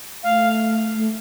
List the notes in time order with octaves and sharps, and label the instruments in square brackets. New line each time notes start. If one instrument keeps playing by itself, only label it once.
[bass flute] A3 [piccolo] F5
[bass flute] A3